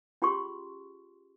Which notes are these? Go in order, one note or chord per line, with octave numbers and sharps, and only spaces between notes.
C#4 F4 G4 G#4 C6 C#6